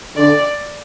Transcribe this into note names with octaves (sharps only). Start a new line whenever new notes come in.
D3 D5